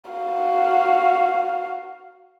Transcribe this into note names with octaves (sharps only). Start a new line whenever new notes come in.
F#4 F5